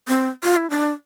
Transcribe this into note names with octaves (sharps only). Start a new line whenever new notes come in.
C4
F4
E4
D4